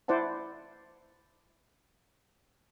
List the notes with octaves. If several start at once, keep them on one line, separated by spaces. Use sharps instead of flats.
E4 C5 D5 F#5 A5